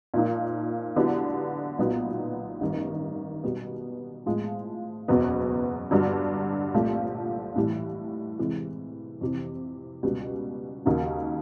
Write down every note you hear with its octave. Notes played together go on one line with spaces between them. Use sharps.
A#2 F3 A#3 D#4
D3 F#3 B3 E4 G4
B1 A#2 F#3 B3 D#4
A1 G2 D#3
B2 G3 B3
A2 F3 G#3
F#1 E2 B2 F#3 B3
G2 D3 F#3
C2 A#2 F3 A3
A2 E3 G3
C3 E3 G#3
F2 C3 E3
C#2 B2 G3
D#2 C#3 F#3 A#3 D#4